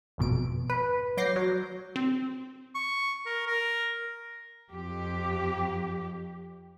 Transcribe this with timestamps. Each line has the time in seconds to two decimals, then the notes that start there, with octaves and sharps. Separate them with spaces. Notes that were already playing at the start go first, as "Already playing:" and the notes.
0.18 G#1 F2 B2 D7
0.70 B4
1.17 F#3 D6 G6 A#6 C7
1.36 F#3
1.96 C4
2.75 C#6
3.26 A#4
3.47 A#4
4.72 F2 G4